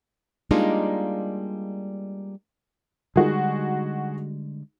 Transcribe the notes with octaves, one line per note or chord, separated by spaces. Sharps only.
G3 G#3 A#3 D4 D#4 F4
D3 G3 G#3 D#4 F#4 G#4